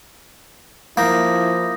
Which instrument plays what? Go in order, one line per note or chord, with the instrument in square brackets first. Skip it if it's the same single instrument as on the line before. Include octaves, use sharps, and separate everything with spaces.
[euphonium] F3 [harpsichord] A#3 [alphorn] E4 [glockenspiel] D#6 G6 A#6